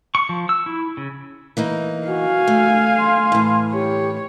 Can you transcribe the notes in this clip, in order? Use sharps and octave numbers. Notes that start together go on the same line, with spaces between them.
C#6
F3
E6
E4
C#3
E3 A#3 D#4
F#4 F5 G#5
A3
C6
A2 E3
G4 C#5